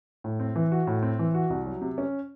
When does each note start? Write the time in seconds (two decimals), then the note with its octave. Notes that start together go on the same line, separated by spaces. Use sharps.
0.24 A2
0.40 C4
0.56 E3
0.72 F#4
0.87 A2
1.03 C4
1.19 E3
1.35 F#4
1.50 C2
1.66 F#3
1.82 C3
1.98 C#4